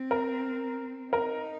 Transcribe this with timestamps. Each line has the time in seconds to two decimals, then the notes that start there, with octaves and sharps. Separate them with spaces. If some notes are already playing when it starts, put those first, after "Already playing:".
Already playing: C4
0.11 A#4
1.13 D#4 A#4